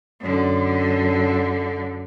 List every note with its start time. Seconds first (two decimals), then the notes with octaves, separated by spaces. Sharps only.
0.20 F#2 D3